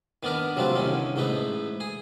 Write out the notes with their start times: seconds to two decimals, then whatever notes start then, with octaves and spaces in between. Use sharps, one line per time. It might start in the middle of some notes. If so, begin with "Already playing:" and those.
0.23 D#3 B3 D4 A#4 B4
0.56 F#3 G3 A3 C4 F4 B4
0.75 C2 D3 D#3 C#4
1.16 A1 G#2 A3 D#4 B4
1.80 G#4